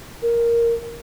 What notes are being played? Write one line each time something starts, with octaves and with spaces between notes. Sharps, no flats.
A#4